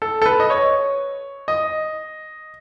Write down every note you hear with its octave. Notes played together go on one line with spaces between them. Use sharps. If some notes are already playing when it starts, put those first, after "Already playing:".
A4
A4
B4
D#5
C#5
D#5